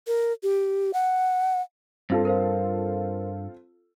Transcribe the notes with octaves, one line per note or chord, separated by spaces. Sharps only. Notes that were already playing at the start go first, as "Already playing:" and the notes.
A#4
G4
F#5
G2 C4 F4 A4
A#4 C5 F5